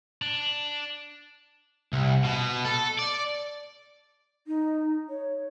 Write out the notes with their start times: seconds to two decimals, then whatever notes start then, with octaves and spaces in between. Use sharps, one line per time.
0.22 D4
1.93 C2
2.24 B2
2.65 A4
2.99 D5
4.47 D#4
5.10 C#5